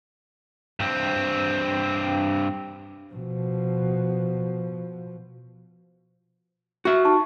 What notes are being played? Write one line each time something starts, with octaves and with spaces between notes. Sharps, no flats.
G2 C4
B2 F3
F#4 E5 C#6
D#4 A5 C#6